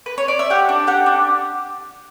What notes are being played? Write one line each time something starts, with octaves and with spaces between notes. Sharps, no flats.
B4
C#5
D5
E5
G4 F#5
D4
G4 F#5
D4